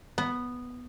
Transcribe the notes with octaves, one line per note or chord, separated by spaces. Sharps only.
B3